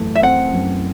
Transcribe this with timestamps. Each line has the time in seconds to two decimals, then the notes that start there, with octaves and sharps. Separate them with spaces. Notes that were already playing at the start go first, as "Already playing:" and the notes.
Already playing: F#2 E3 A3
0.15 E5
0.22 C4 F#5
0.53 F#2